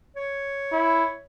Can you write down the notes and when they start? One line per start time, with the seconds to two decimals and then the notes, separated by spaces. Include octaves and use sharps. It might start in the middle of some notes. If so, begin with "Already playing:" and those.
0.16 C#5
0.72 E4